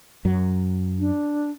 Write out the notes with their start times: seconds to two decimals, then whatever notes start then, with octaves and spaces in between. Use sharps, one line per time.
0.25 F#2 F#3
0.99 D4